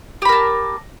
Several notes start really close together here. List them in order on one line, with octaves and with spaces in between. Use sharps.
G4 B5 A#4 A5